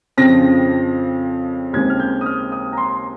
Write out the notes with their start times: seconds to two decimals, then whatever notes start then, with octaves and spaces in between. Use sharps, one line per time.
0.17 F2 C#3 F3 C4 A#6
1.73 D#2 C#3 G#3 C4 G#6
1.90 F6
2.00 G6
2.21 D#6
2.26 F6
2.52 D#6
2.73 A#5
2.77 C6